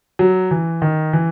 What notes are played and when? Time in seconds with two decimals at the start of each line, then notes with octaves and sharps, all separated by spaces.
0.19 F#3
0.51 E3
0.82 D#3
1.13 E3